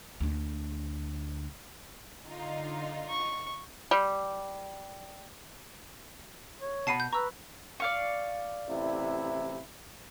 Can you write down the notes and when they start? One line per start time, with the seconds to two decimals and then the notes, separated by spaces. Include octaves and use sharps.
0.20 D2 D4
2.29 D3 D#4 F4
3.09 C#6
3.91 G3
6.60 C#5
6.87 B2 F#5 A5 B5 C7 D#7
7.00 G6
7.13 B4 A#5 C#6 E6
7.80 D5 F5 C#6
8.67 A1 C3 E4